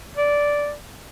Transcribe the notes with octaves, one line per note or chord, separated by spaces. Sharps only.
D5